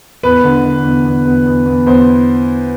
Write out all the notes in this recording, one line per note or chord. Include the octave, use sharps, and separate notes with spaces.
E2 B4
D3
D3
E2
E2
E2
E2
E2
E2 C5